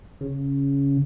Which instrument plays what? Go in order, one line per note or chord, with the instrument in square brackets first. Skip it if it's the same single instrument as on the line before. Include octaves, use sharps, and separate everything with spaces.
[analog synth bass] C#3